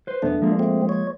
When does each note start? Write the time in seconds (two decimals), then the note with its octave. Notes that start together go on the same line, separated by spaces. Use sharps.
0.07 B4 C5
0.22 B1 E2 A3 B3 D4
0.42 F3 G#3 A#3
0.59 A3 C4
0.89 C#5